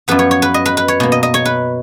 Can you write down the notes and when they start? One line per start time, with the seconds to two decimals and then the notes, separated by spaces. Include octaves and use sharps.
0.08 F#2 F3 B3 B4
0.19 C#5
0.31 C#5
0.42 B4
0.54 D#5
0.66 B4
0.77 B4
0.88 C#5
1.00 B2 A#3
1.12 D#5
1.23 D#5
1.34 C#5
1.45 B4